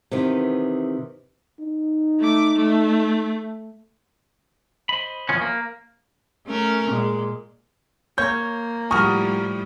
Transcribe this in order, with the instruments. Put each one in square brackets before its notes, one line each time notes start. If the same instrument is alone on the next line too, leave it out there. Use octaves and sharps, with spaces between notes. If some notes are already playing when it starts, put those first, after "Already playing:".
[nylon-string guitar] C3 D#3 E3 B3
[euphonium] D#4
[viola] A3 D6
A3
[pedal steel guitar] C5 D#5 B5
[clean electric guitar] E2 F3 C#4
A#3
[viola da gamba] A3 C#4 A#4
A#2 G#3
[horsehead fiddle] A#3 [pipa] C#5 [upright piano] G6
[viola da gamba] A2 F3 G3 [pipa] F#4 A#4 [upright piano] C#6 D#6 F6